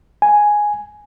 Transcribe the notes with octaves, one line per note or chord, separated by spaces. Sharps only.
G#5